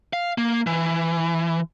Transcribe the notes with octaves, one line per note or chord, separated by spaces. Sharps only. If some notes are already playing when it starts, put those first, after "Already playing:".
F5
A#3
E3